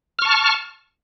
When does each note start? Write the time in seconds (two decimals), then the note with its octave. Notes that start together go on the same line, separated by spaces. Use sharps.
0.19 F6
0.22 C#6
0.25 A5